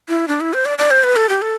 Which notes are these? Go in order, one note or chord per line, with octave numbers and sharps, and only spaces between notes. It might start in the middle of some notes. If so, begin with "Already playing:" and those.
E4
D4
E4
C5
D5
D5
C5
B4
A4
G4
A4